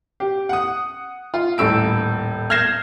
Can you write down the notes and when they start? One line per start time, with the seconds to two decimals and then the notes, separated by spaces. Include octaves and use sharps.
0.20 G4
0.49 F#5 D#6
1.34 F4
1.58 D#1 A2 E6 D7
2.50 F6 G6 G#6 A#6 C7 E7